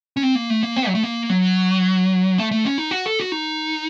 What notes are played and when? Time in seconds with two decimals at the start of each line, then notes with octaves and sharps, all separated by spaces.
0.17 C#4
0.23 C4
0.35 A#3
0.50 A3
0.63 A#3
0.76 C4
0.88 F#3
0.95 A3
1.03 A#3
1.30 F#3
2.38 A3
2.51 A3
2.65 C#4
2.78 D#4
2.91 F#4
3.06 A4
3.19 F#4
3.32 D#4